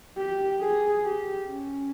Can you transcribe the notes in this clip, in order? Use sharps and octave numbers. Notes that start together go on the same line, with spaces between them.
G4
G#4
G4
C#4